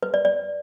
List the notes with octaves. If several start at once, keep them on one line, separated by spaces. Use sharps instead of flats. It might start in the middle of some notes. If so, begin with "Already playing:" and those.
B4
D5
D5